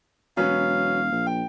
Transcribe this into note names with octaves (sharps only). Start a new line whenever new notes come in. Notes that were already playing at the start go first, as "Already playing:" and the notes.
E1 F#3 B3 C#4 F5
A#1
G5